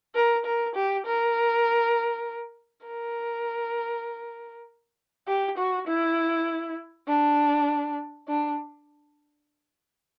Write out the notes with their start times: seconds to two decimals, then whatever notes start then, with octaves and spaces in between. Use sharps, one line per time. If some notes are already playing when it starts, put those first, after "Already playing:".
0.15 A#4
0.46 A#4
0.75 G4
1.06 A#4
2.86 A#4
5.28 G4
5.58 F#4
5.87 E4
7.08 D4
8.28 D4